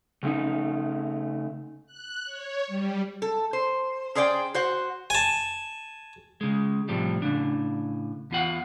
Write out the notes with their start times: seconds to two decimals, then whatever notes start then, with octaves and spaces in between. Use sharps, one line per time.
0.23 C#3 A3 B3 C#4 D#4
1.86 F#6
2.24 C#5
2.67 G3
3.22 A4
3.53 C5
4.15 C#4 G#4 C5 D5 F#5 G5
4.54 F#4 C5 F#5
5.10 G#5 A5
6.41 C#3 G#3
6.89 A2 C3 F3 G3
7.22 A2 C#3 D4
8.31 E2 F4 F#5